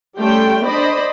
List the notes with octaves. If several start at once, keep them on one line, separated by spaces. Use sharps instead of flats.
G3 A3 C#4 G5 C6
D4 C5 D5 D#5 B5